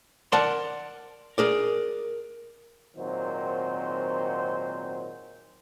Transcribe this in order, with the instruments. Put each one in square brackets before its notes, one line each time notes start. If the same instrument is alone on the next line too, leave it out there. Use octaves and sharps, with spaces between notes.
[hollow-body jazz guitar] A#4 D5 F#5 A5 C6
G#4 A#4 D5
[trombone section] G#1 A#2 D#3 F#3 C4 C5